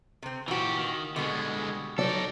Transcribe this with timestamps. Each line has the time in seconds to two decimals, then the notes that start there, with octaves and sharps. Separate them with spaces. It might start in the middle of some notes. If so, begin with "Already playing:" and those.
0.23 C3 C4
0.48 A#2 E3 F#4 G4
0.78 D#3
1.16 B2 D3 G3 G#3 B3
1.98 F#3 D#4 A4 D5